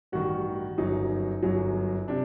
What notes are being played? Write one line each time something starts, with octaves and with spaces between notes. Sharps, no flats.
A1 G2 D#3 F#4
G1 F#2 F#3 D#4
G1 F#2 F#3
C3 D4